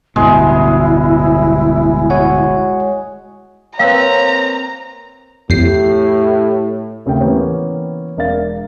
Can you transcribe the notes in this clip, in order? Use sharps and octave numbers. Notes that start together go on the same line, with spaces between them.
D1 G1 B2 G#3 E4
F#4 C#5 F#5
A#3 C4 B4 C#5 F5 G5 A#5 E6
F2 A2 G4 C7
D#2 C#3 A3 G5
E3 A#3 B3 C#4
E1 D4 A#4 D5 F5 A6